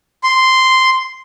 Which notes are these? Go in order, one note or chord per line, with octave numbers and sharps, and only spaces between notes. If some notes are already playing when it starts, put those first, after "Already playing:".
C6